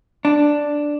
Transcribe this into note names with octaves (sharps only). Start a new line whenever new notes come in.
D4